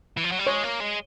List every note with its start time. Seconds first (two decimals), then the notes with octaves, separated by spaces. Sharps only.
0.17 E3
0.24 F3
0.32 F#3
0.39 G3
0.47 G#3 C#5
0.64 A#3
0.80 G#3